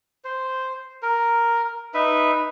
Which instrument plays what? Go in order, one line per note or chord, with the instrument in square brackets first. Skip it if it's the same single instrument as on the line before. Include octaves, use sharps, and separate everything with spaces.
[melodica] C5
A#4
D#4 B4 E5